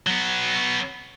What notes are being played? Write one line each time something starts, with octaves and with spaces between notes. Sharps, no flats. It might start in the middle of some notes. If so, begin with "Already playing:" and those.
F#3 B3